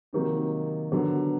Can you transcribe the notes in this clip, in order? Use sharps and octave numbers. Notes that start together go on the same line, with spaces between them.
C3 D#3 F#3 A#3 D#4
D3 F#3 B3